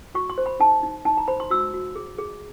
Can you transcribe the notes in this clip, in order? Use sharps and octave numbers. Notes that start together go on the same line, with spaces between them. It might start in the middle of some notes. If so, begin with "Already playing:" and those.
F#4 C#6
C6
C5
B5
D#4 A5
D#4
D#4 A5
A#5
C5 B5
C6
F#4 E6
F#4
G#4
G#4